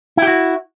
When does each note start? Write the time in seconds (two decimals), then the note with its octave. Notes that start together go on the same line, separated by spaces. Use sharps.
0.17 E4
0.22 G4
0.27 F#4